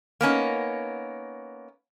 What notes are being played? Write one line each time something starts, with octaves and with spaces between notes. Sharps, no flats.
A#3 B3 C#4 D#4